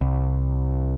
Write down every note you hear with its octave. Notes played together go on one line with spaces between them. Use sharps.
C2